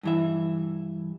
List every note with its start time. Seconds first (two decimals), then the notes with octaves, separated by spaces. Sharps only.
0.03 G2 E3 E5